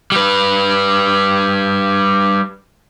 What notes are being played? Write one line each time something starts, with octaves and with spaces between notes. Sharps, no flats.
G3 B4